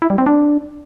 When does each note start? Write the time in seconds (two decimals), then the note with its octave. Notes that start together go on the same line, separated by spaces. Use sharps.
0.02 E4
0.10 G3
0.18 C4
0.26 D4